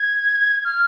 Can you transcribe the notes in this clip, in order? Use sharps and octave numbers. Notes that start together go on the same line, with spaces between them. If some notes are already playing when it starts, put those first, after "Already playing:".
Already playing: G#6
F6